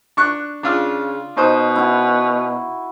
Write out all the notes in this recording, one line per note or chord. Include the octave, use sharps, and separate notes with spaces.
D4 C#6 F#6
C#3 D4 F4 E6
B2 D#4 C5 D#6
E4 F#4 G#5